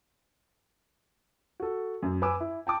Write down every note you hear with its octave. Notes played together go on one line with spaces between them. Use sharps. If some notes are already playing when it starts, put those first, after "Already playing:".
F#4 A4
F#2
B4 G#5 D6 E6
E4
G5 A5 D6